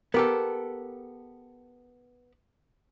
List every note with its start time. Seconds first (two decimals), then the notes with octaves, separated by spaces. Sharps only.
0.14 B3 G4 A4 A#4